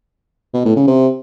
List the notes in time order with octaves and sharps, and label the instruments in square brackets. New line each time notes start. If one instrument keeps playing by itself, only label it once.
[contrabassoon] B2
A2
C#3
C3